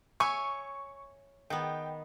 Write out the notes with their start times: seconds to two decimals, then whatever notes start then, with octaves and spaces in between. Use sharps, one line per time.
0.20 C#5 E5 G#5 C#6
1.50 D#3 B3 G5